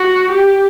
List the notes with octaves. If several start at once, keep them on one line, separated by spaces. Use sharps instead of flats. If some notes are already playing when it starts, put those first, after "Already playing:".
Already playing: F#4
G4